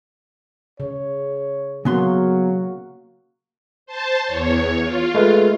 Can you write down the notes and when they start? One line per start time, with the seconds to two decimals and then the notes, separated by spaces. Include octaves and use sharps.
0.80 C#3 C#5
1.85 C#3 F#3 A#3 B3 F#4 C6
3.86 C5 A5
4.26 E2 C#5
4.83 F4
5.15 G#3 A3 B4